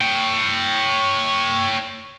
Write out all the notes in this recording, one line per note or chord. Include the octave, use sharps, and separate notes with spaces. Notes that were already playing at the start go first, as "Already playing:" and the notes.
C#5 G5